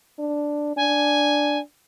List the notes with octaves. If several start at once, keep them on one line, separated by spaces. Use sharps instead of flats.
D4
D4 G#5